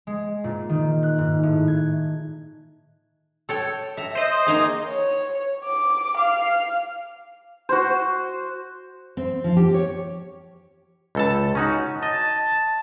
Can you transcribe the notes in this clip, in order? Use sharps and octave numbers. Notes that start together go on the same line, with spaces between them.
G#3
A#2
D#3
F#6
G#2
A2
G#6
A4 C#5 G5
E5 A#5
C5 D#5
A#3 D#4 G#4
C#5
D6
F5
F#4 C5
C4
F3
G4
C#5
C#2 A4 A5
C#4 D#4 F#4
D#5 A5